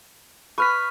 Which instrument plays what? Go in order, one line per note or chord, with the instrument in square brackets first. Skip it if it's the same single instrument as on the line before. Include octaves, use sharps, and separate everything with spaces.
[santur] B4 [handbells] C#6 F6 B6